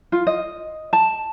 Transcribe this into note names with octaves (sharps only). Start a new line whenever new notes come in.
F4
D#5
A5